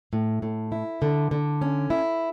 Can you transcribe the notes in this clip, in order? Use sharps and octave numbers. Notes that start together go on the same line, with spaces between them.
A2
A2
E4
D3
D3
C#4
E4